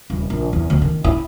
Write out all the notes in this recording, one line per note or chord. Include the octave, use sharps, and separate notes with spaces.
D#1
A#1
E2
D2
D#3
E4